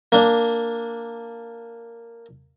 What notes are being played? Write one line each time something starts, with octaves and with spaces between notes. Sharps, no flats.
A#3 D4